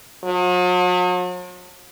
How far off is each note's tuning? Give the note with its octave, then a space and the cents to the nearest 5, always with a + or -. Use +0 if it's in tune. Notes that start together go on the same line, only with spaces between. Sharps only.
F#3 -45